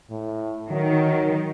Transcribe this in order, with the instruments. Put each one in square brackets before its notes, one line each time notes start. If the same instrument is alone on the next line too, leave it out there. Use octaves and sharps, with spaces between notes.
[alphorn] A2
[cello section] D#3 [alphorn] F#3